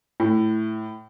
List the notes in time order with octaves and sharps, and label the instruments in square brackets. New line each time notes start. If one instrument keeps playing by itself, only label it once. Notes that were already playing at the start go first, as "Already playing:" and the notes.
[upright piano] A2